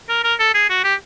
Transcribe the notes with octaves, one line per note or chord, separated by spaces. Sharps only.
A#4
A#4
A4
G#4
F#4
G4